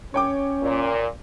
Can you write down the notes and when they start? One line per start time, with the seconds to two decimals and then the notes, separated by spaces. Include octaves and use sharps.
0.14 C#4 C#5 G5 D6
0.62 A#2